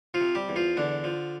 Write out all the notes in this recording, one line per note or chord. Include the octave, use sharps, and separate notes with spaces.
F3 F4
C3
G3 G4
E2
F3 F4
E2 D3 D4
F3